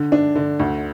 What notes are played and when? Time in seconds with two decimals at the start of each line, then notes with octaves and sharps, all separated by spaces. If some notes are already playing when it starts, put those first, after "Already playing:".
Already playing: D3
0.12 D4
0.36 D3
0.59 D2